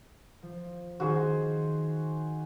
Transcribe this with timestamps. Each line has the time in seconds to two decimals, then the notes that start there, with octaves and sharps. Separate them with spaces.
0.43 F3
1.00 D#3 F#4 G#4 C5